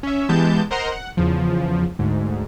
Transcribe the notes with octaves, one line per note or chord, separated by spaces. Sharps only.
C#4 E5
E3 G#3 B3 G4 A5 G6
A#4 C5 D#5 F#5 A#5 C6
F#5
E2 C#3 F3
D2 G#2